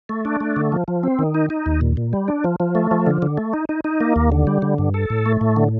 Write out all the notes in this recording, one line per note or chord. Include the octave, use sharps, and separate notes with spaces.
A3
D4
A3
D3
F3
F3
C4
D#3
D#4
D#4
D#2
A#2
A#2
G3
D4
F3
F3
A3
F3
D3
D3
A3
D#4
D#4
D#4
A#3
D#2
D3
G3
D3
G2
A4
A2
A3
A2
D3